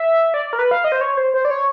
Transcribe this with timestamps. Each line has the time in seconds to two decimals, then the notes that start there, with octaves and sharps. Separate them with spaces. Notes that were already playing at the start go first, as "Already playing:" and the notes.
Already playing: E5
0.34 D5
0.46 D5
0.53 A#4
0.59 B4
0.71 F5
0.84 D#5
0.92 C5
1.01 C#5
1.17 C5
1.34 C5
1.45 D5
1.50 C#5